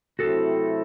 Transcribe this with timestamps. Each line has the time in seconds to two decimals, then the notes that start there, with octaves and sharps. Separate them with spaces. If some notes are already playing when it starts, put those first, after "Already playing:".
0.19 C3 F#3 A3 C4 E4 F#4 A4